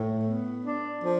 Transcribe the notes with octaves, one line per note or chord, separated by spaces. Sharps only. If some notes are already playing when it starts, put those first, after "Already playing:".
Already playing: A2
B3
D4
F3